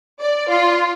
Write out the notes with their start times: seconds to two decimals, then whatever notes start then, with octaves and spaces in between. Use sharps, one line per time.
0.20 D5
0.49 F4